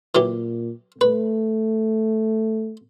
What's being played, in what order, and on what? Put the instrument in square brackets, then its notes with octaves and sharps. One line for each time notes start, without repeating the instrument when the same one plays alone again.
[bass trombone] A#2 [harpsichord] E3 F#3 G4
[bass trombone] A3 [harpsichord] B4